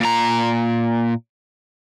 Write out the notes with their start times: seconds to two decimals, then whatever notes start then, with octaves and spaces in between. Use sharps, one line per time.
0.01 A#2 A#5